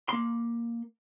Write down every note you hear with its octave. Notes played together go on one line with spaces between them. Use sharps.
A#3 C6